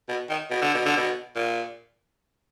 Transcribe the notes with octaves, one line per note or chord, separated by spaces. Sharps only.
B2
D#3
B2
D3
B2
D3
B2
A#2